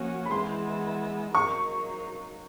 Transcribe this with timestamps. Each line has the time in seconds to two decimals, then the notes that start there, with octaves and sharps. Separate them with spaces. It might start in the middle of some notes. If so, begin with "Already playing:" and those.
Already playing: F3 A#3 C#4 F#4
0.26 B5
0.31 E3 G#3 B3 E4 C6
1.34 F#3 A#3 D#4 C#6